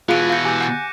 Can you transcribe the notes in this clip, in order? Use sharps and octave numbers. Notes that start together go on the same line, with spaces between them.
B2 E3 F4 G#4 F5 F#6 D7 D#7
F5 G6 A#6 C#7
G4 G#5 D6 G6
F#5 F#6 G6 A6